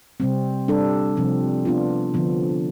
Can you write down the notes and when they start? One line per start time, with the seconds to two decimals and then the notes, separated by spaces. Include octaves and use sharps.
0.20 C3 G3 C4
0.68 G3 D4 A4
1.17 C3 F3 C4
1.65 B3 D4 F4
2.14 D3 F3 B3